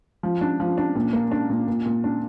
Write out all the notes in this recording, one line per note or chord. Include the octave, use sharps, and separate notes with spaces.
F3
D4
F3
D4
A#2
A#3
D4
A#2
A#2
A#2
D4